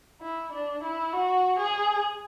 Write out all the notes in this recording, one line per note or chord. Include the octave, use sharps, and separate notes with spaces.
E4
D4
E4
F#4
G#4